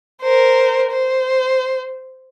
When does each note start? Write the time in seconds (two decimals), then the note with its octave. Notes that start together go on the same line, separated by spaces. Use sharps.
0.22 A#4 C5
0.92 C5